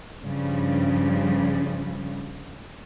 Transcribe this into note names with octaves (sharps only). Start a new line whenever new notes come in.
G2 C#3 F3 G3